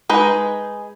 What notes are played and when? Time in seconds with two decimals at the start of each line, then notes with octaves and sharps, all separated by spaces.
0.09 G#3 D#4 B4